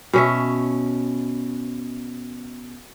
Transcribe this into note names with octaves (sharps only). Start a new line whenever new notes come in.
B2 C#4 E5